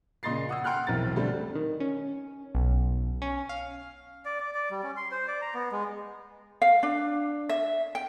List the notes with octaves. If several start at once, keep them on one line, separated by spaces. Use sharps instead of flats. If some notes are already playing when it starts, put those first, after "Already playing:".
A#2 C#3 D#5 C6 A6 C7
F#5 D#6 E6
F#5 G5 C6 F6 F#6
E1 B1 C4 E4 A#4 A6
B2 D3 G3 A3 C4
D#3
C#4
B1
C#4
F5
D5
D5
D5
G3
C#4
C6
C5
D5
A#5
B3
G#3
F5
D4
E5
G5